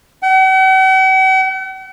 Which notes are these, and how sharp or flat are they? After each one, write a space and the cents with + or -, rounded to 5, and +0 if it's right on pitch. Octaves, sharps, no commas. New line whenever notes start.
F#5 +45